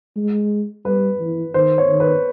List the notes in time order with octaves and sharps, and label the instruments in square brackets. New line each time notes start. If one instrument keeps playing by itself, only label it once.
[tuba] G#3
[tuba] G3 [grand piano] B4
[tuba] E3
[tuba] D#3 [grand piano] C5
[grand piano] C#5
[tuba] D#3
[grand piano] B4